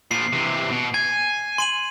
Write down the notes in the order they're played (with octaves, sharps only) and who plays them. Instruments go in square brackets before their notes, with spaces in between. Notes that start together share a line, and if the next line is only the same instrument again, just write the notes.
[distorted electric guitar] A#2 F3 [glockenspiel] C7
[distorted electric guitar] C3 E3
B2
[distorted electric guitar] G#5 [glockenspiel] G#6
[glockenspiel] C6 D#7 F#7